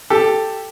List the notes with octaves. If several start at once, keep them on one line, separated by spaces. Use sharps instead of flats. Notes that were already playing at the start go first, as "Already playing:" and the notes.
G4 A4